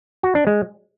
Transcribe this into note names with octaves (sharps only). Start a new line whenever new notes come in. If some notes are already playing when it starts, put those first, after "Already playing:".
F#4
D4
G#3